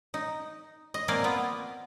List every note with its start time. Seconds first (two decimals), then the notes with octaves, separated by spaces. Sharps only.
0.14 D#4
0.94 D#5
1.08 A#3 C4 A#4 D5 F5 G#5
1.24 B3 F4